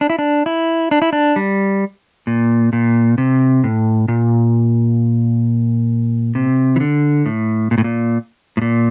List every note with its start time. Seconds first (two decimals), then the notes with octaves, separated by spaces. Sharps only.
0.01 D4
0.10 E4
0.19 D4
0.46 E4
0.91 D4
1.02 E4
1.13 D4
1.36 G3
2.27 A#2
2.73 A#2
3.18 C3
3.64 A2
4.08 A#2
6.35 C3
6.76 E3
6.80 D3
7.26 A2
7.71 A#2
7.78 A2
7.84 A#2
8.57 A2
8.62 A#2